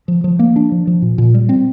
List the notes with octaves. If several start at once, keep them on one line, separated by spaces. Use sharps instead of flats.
F3
F3
A#3
D4
F3
F3
A#2
A#2
G3
C4